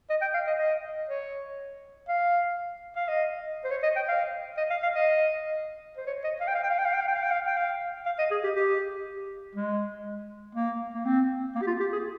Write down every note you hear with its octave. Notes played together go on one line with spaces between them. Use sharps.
D#5
G5
F5
D#5
D#5
C#5
F5
F5
D#5
C5
C#5
D#5
G5
F5
D#5
F5
F5
D#5
C5
C#5
D#5
F5
G5
F5
G5
F5
G5
F5
G5
F5
G5
F5
G5
F5
G5
F5
F5
D#5
G#4
G4
G4
G#3
A#3
A#3
C4
A#3
G4
F4
G4
G#4